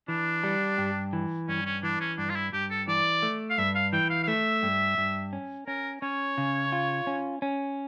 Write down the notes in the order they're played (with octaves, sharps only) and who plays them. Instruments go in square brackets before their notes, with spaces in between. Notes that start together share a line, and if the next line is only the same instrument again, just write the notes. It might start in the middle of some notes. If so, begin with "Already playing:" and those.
[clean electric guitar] E3 [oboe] D4
[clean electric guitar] G3
G2
E3
[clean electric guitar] G2 [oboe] C#4
[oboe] C#4
[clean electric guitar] E3 [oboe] D4
[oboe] C#4
[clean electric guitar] G2 [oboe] D4
[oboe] F4
E4
[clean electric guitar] G2 [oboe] G4
[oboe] A4
[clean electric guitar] E3 [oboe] D5
[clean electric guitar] A3
[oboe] F5
[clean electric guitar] G2 [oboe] E5
[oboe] F5
[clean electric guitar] E3 [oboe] G5
[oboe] F5
F5
[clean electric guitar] A3 [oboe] E5
[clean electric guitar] G2
G2
C#4
[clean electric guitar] C#4 [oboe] A#4
[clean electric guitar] C#4 [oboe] C#5
[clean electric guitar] C#3
F4
C#4
C#4